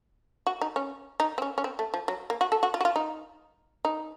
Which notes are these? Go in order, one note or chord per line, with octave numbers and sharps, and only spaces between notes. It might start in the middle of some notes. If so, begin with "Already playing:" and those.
F#4
D#4
C#4
D#4
C4
C#4
C#4
C4
A3
F3
F#3
A#3
F#4
A4
F#4
F4
F#4
F4
D#4
D#4